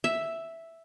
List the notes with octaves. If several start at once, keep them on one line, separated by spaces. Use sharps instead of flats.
E5